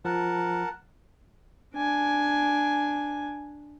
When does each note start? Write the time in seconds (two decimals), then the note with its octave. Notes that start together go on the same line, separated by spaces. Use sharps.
0.05 F3 A#4 F#5 A5
1.75 D4 G#5